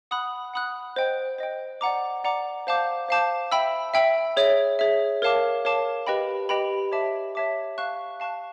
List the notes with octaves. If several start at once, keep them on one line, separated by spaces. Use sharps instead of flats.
F#5 B5 D#6 F#6
F#5 B5 D#6 F#6
C5 D#5 G5
C5 D#5 G5
D5 F#5 A#5 D6
D5 F#5 A#5 D6
C5 F5 A5 D6 G6
C5 F5 A5 D6 G6
E5 G5 B5 E6
E5 G5 B5 E6
G#4 C#5 E5
G#4 C#5 E5
A#4 C#5 F5 A5 D6
A#4 C#5 F5 A5 D6
G4 B4 D#5 G5 B5
G4 B4 D#5 G5 B5
C#5 E5 A5 D6
C#5 E5 A5 D6
F5 A5 C#6 F#6
F5 A5 C#6 F#6